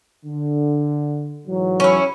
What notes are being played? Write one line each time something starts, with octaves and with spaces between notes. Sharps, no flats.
D3
G#2 E3 F#3
C#4 E4